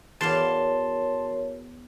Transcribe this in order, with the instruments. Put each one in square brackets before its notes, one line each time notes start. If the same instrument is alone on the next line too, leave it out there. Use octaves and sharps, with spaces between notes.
[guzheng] E2 D5 F5 [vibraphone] F#4 A#4 C#5 [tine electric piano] A5 C6